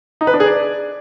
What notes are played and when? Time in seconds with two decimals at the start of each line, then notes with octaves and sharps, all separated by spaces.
0.21 D#4
0.27 B4
0.34 D4
0.40 G#4
0.46 D5